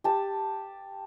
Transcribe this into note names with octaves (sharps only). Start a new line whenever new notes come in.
G4 A5